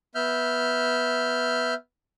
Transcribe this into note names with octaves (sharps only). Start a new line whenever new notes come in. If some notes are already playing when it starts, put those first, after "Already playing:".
B3 E5 F6 G6